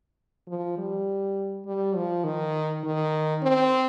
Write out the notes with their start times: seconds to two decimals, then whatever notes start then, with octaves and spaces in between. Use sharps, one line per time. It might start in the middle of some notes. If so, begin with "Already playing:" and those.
0.48 F3
0.78 G3
1.66 G3
1.96 F3
2.24 D#3
2.84 D#3
3.43 C4